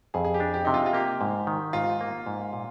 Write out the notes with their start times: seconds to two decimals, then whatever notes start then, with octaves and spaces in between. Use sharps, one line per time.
0.14 F2 G#4
0.25 G#4
0.34 G4
0.40 D4
0.54 G4
0.65 C3 D#4
0.74 F4
0.86 F4
0.93 A#3 G4
1.21 G#2
1.47 D#3
1.73 G#2 F4
2.01 A#3
2.26 G#2
2.53 A#2